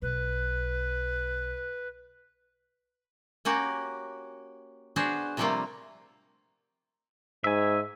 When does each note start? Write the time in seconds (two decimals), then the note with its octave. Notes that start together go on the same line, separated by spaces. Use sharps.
0.02 B1 B4
3.45 A#3 C#4 F#4 G4
4.96 B3 D4 F#4 G#4 C5
5.37 C3 F3 G3 A3 A#3 F4
7.44 G#2 E5 G#5